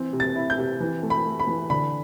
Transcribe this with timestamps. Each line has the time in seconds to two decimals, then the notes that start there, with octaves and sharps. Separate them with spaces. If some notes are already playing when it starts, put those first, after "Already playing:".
Already playing: E3 C4
0.13 C3
0.20 A6
0.36 E4
0.50 G6
0.58 C3
0.80 E3
1.03 A3
1.10 B5
1.25 A3
1.40 B5
1.47 E3
1.70 D3 B5